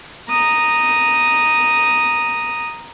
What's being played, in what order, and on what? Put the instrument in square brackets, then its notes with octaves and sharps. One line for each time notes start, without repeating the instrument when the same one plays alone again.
[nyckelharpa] A#5 D#6